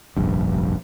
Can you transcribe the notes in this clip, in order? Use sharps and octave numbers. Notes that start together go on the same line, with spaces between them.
F1 A#1 G2